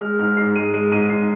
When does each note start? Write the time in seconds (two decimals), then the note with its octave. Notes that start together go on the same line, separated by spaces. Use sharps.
0.01 G#3 F6
0.19 G#2 F6
0.37 G#2 C7
0.55 G#3 D#7
0.74 G#3 D#7
0.92 G#2 D#7
1.09 G#2 C7